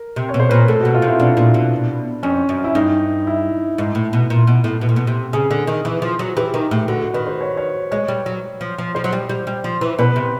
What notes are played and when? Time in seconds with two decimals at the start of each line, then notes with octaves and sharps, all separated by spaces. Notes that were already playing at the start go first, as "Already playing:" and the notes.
Already playing: A#4
0.16 C3
0.29 C#5
0.34 B2
0.40 C5
0.49 A#2 B4
0.58 A#4
0.68 A2 A4
0.81 F#4
0.85 B2
0.94 F4
1.02 C3
1.07 E4
1.20 B2 D4
1.37 A#2
1.54 B2
2.23 F2 C#4
2.49 F#2
2.64 E4
2.75 G2 D#4
3.27 E4
3.78 G#2
3.95 A2
4.13 B2
4.30 A#2
4.47 B2
4.64 A2
4.81 B2
4.89 A#2
4.96 B2
5.07 C3
5.33 C#3 G#4
5.51 D3
5.67 D#3
5.85 E3
6.02 F3
6.19 F#3
6.37 E3 G4
6.54 D#3
6.71 A2
6.88 D3 F#4
7.01 F#4
7.14 D#3 B4
7.27 C5
7.41 C#5
7.57 C#5
7.91 G#3 C#5
8.08 G3
8.26 F#3
8.61 F3
8.78 F3
8.95 F3 C5
9.04 F#3
9.13 G3
9.29 G3
9.47 G3
9.64 F3
9.81 E3
9.99 B2 B4
10.16 C3